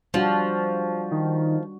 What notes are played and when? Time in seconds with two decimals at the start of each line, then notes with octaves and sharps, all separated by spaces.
0.14 F3 G3 D4 F#4
1.11 D#3